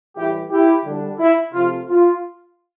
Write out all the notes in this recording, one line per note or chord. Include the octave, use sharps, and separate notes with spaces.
A2 E3 G3 E4 G4
E4 G4
D3 G3 D4
E4
C3 F3 A3 F4
F4